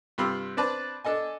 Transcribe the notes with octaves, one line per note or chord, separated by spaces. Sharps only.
G2 C3 F4 B5 C6 E6
C4 D4 B4 D5 A5
D4 A4 D#5 G#5